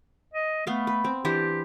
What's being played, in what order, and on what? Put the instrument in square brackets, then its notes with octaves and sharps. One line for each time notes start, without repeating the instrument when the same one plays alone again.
[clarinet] D#5
[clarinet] A3 [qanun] B3 F5
[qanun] B4
C4
[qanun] E3 D4 C5 [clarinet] G4